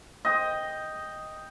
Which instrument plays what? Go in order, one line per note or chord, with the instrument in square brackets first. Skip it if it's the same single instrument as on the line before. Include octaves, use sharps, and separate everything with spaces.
[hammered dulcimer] D#5 G5